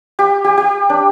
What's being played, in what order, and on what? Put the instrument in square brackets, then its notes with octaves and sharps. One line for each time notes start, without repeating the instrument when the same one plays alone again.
[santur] G4
G4
G4
D4